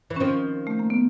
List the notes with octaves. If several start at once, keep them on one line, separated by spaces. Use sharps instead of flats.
E3
C#4
D#3 F3 C4
A3
A#3
B3